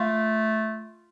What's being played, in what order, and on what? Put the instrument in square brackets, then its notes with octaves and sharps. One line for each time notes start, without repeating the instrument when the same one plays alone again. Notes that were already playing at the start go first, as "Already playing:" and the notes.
Already playing: [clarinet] A3 [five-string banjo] F4